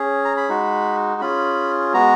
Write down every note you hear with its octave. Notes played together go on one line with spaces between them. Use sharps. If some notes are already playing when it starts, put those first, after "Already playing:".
Already playing: C#4 G#4
A#5
B5
G#3 D#4 F#4
C#4 F4 G#4 B5
G#3 B3 F#4 A#5